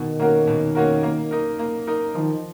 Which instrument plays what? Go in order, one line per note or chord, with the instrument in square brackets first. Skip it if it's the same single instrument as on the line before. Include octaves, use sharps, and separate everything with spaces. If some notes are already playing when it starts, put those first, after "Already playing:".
Already playing: [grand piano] B2 [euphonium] D#3
[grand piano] A#3 C#4 F#4 A#4
B2
A#3 C#4 F#4 A#4
A#3
D#4 A#4
A#3
D#4 A#4
[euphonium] D#3 [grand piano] F3